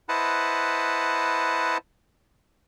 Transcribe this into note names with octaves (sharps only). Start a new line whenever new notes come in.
E4 B4 C5 D#5 F#5 A5